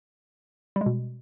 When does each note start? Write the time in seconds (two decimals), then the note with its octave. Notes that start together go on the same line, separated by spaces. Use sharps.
0.76 G3
0.81 G#3
0.86 B2